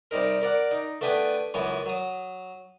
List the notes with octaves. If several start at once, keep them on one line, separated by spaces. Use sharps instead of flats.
C3 G3 D#4 A#4
A#4 D5 F#5
D#4
A3 B3 D4 B4 G5 G#5
C#2 F#2 E3 B3 C#5 G#5
F#3 D#6